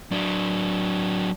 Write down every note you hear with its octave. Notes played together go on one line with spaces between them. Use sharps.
F#3 D4